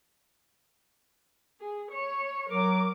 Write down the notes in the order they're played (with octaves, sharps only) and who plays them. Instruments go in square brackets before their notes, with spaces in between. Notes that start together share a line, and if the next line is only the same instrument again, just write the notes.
[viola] G#4
C#5
[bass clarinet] F#3 [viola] A#4 D6